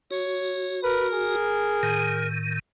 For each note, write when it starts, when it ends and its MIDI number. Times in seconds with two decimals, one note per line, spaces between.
0.11 1.36 66
0.11 0.80 73
0.83 2.27 70
0.83 1.08 71
1.14 2.35 68
1.83 2.59 45
1.83 2.59 51